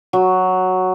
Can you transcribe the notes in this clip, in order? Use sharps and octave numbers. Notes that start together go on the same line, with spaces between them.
F#3